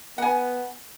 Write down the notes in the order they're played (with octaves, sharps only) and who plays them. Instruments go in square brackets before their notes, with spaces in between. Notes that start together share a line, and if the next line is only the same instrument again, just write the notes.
[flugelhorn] B3 [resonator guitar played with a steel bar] F#5 G#5